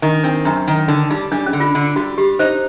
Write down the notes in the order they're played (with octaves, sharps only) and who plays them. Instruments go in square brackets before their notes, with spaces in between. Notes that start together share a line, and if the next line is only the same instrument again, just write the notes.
[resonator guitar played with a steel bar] D#3 [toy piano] D4
[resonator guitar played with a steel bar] C4 [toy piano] D4
[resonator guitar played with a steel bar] F#2 [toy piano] D4
[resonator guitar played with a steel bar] D#3
[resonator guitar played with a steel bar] D3 [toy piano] D#4
[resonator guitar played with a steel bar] G3 [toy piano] D#4
[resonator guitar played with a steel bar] G3 [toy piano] D4
[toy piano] C#4
[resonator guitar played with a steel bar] D3
[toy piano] F4
[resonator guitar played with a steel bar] D3
[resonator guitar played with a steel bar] G3 [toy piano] F#4
[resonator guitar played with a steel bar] G3 [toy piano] G4
[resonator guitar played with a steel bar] D#4 [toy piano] C5